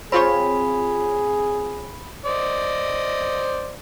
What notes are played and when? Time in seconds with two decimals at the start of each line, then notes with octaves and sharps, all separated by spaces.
0.12 C4 F4 G#4 C#5 B5
2.25 C5 D5 D#5